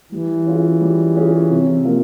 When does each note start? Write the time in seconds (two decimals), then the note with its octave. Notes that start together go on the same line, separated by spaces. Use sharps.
0.12 E3 G3
0.47 C#4 F4 G#4
0.80 G3
1.15 C#4 F4 G#4
1.49 C3
1.84 F3 A#3